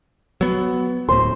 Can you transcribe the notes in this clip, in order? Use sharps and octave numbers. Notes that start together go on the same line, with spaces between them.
F#3 B3
D1 A2 C5